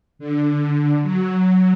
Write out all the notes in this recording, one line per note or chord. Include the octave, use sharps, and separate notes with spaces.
D3
F#3